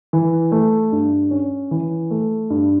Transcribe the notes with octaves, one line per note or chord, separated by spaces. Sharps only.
E3
A3
G2
C#4
E3
A3
G2